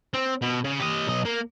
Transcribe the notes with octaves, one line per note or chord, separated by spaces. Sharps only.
C4
B2
C#3
G4 D#5
B1 D#5
A#3